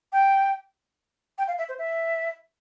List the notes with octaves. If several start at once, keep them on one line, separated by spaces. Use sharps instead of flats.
G5
G5
F5
E5
C5
E5